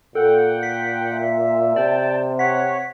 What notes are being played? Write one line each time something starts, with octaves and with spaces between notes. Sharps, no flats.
A#2 A4 F#5 G5
B6
E5
C3 D5 G5 A5
C#5 F#5 B6